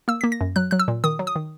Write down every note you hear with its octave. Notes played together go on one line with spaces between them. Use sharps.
A#3 E6
A#3 B6
A#6
F#2
F#3 F#6
F#3 F#6
E6
A#2
D#3 D#6
F#3
D#6
D#3